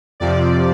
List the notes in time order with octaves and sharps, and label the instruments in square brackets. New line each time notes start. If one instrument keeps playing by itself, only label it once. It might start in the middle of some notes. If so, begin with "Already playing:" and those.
[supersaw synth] F2 C3 F3 D5